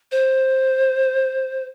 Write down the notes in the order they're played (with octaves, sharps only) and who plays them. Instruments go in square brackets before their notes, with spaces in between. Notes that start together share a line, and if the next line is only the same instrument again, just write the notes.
[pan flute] C5